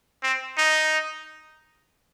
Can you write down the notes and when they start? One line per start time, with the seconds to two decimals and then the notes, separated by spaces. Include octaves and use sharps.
0.23 C4
0.58 D#4